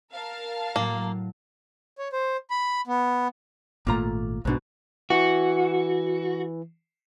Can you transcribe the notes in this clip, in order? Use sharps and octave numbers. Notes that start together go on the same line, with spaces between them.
A#4 F5 A5
A2 F#3 A#3
C#5
C5
B5
B3
G#1 A#2 A3 A#3 F4 A#5
B1 G#2 B2 F3 D4
E3 F#4